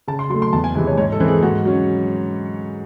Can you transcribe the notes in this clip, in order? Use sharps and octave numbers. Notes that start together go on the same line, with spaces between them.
C#3 A5
C6
F#3 A3 C6
C6
E2 A5
G#5
C3 E3 G#3 G#5
C#5
G#2 C#5
A4
E3 C4
G#4
G#2 F#4
F#3 C#4